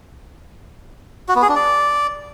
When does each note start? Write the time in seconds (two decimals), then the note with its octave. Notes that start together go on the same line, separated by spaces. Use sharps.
1.28 F#4
1.35 B3
1.42 G#4
1.49 D4
1.56 D5